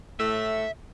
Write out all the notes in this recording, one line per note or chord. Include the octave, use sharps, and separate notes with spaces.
A2 A3 E5